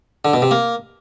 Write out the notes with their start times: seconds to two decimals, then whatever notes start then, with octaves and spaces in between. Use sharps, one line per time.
0.25 D3
0.33 B2
0.42 C3
0.51 A#3